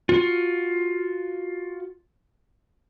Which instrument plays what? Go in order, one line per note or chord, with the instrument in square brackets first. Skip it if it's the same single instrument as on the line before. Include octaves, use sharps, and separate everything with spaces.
[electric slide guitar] F4 F#4